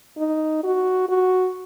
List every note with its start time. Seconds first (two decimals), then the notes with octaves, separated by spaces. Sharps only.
0.18 D#4
0.64 F#4
1.09 F#4